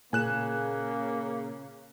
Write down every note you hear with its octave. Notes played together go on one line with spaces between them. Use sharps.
A#2 C#3 A#3 G#5 F#6 E7